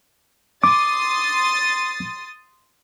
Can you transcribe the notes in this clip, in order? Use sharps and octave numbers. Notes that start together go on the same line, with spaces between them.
C6 D6 D#6 A6